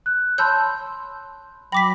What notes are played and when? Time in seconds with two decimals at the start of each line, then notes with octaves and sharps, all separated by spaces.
0.06 F#6
0.38 C#5 A5 B5 C6 E6 G6
1.72 F#3 G5 B5 D6 A#6 B6